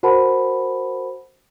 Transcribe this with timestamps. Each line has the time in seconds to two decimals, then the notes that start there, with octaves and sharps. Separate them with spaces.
0.03 F#4 A#4 C5 F#5 A5 B5